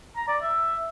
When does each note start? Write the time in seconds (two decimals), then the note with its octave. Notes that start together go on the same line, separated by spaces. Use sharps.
0.16 A#5
0.28 D5
0.42 E5